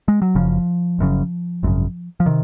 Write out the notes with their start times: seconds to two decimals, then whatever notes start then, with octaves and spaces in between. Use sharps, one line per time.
0.08 G#3
0.22 F#3
0.35 F#1 F#2 C#3 F3
0.99 F#1 F#2 C#3
1.63 G#1 F#2 C#3
2.20 F3
2.26 C3 D#3